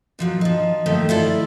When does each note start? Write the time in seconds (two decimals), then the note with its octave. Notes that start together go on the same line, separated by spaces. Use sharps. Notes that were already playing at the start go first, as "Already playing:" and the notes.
0.19 A#2 F3 F#3
0.41 F3 D#4
0.86 D#3 F3 A3 A#3 D#4 A4
1.09 E4 F4 A4 D5